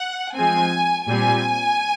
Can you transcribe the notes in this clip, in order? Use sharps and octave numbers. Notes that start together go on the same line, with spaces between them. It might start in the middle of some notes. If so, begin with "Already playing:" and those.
Already playing: F#5
F3 G#3 C4 G#5
A#2 G3 C4 G#5